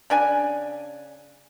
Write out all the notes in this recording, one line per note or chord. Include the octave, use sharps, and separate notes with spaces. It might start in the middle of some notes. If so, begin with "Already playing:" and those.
C#3 D4 G#5